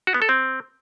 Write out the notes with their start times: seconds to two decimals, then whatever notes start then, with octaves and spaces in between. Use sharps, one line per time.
0.07 F#4
0.14 B3
0.22 A4
0.29 C4